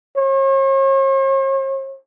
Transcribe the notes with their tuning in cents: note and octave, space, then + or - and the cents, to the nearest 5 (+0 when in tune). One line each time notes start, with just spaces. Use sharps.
C#5 -45